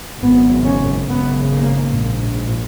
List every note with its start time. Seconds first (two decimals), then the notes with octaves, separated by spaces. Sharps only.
0.20 G#1 F#2 C#3 B3
0.64 C#4
1.08 G#1 F#2 C#3 B3
1.52 A#3
1.96 A#1 G#2